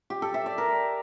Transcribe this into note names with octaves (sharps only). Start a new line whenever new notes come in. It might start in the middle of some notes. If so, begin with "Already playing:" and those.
G4
A4
E5
D5
A#4